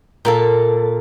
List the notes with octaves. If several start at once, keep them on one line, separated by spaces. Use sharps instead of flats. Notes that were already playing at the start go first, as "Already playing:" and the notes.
A#2 A#3 A4